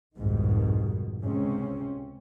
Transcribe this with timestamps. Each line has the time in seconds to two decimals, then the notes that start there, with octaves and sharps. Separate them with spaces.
0.17 C2 F2 G#2 B2 D#3
1.21 C#2 C3 C4 C#4